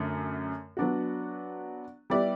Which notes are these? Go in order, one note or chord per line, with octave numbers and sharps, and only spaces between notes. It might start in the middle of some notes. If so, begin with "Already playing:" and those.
Already playing: F#2 D3 A3
F#3 B3 D4 F#4
G3 B3 E4 G4 D5